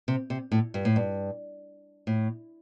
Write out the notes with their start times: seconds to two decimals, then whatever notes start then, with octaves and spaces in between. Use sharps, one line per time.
0.08 C3
0.30 C3
0.52 A2
0.74 G2
0.85 A2
0.96 G2
2.07 A2